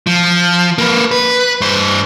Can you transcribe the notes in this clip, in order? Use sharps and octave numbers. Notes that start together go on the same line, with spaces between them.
F3
A#3 B4
B4
G2 C5